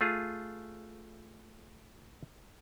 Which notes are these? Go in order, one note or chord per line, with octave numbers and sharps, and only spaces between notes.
A3 F4 G#4